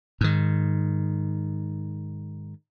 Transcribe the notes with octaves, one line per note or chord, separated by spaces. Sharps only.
G#2 D#3